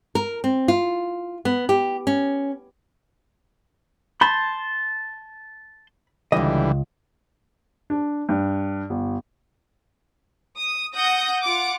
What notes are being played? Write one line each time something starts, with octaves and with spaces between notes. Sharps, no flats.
A#4
C4
F4
B3
G4
C#4
A5 B5 C6 G6
C#2 D3 E3 G3 D#5
D4
G2
G1
D#6
F#5 D#6 G6 A#6
F4 F#5 D6